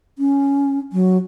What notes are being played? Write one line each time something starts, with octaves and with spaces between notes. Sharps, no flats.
C#4
F#3